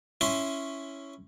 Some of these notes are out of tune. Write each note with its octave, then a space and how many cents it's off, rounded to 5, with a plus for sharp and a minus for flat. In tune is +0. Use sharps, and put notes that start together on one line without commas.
C#4 +0 E4 +0 C6 +0